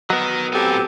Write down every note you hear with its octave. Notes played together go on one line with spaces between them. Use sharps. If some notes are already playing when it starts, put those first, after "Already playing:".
F#3 B3 A#4 D#5
A2 C4 G4 A4 G#5